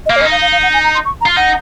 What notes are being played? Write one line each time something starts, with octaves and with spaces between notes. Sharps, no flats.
D#5
A#3 F5
C#5
C#4 D#5
D#4
F5
F5
F5
F#5
G#5
A#5
C6
C#6
A#5
F4
D#4 F#5